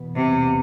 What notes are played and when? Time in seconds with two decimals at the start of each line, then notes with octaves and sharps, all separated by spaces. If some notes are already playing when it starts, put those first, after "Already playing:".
Already playing: E2 B2 B3
0.16 C3